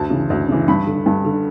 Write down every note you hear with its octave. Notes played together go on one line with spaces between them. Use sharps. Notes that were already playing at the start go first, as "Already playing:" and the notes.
Already playing: D2 A5
C#3 E3
D2
C#3 E3
G2 B5
D3
G2
D3